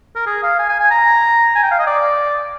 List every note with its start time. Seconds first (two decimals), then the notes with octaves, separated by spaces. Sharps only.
0.16 A#4
0.26 G#4
0.43 F5
0.59 G#5
0.69 G#5
0.80 G#5
0.90 A#5
1.55 G#5
1.63 G5
1.71 F5
1.79 D#5
1.87 D5